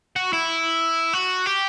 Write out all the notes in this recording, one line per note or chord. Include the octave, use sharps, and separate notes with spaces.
F#4
E4
F#4
G4